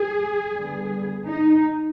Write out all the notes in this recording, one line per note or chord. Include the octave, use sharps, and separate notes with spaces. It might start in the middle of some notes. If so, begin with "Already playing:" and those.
Already playing: G#4
D3 G3 B3
D#4